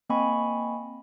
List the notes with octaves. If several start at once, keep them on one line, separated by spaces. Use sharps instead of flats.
A#3 C4 D#5 G#5 B5 C#6